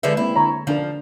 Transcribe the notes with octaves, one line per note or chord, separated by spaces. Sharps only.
D3 F3 G#3 E4 G#4 B4
A#3 C4 E4
D3 C#5 A#5
D3 F3 D4 A#4